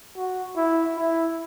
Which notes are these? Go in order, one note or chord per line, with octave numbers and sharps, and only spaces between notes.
F#4
E4
E4